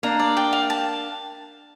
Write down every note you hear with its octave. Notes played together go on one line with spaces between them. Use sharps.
A#3 D4 A#5
D5
G5
F5
A5